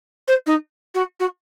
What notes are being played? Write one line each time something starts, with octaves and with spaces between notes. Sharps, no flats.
C5
D#4
F#4
F#4